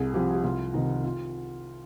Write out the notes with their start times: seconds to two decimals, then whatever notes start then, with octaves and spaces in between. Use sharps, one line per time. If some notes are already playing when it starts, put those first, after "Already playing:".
Already playing: C2 G#4
0.14 C3 F3 G4
0.34 G4
0.44 C2 F4
0.74 C3 D#3 D#4
1.04 F4